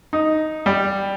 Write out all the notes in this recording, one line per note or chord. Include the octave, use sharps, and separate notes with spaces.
D#4
G3